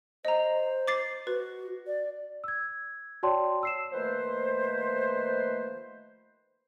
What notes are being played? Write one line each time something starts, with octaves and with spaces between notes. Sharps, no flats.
C5 D#5 A#5
D6 A6 C7
F#4 B4
D5
E6 G#6
F#4 C#5 D5 G5 A5 C6
E6 C7 E7
D#3 F3 A3 A#3 B4 C5